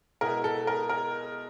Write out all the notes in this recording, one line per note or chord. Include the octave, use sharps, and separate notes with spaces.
B2 G#3 B3 E4 A#4
A4
A#4
A#4